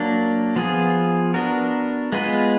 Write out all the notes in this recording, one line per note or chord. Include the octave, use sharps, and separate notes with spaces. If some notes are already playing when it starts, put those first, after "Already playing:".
Already playing: F#3 A#3 D4
F3 B3 F4 G#4
B3 D4 F#4 A#4
G#3 B3 F4 B4